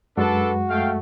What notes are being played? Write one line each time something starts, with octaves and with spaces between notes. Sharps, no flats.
F#2 G#3 D4 F#4 A4 B4
A3 F5 G5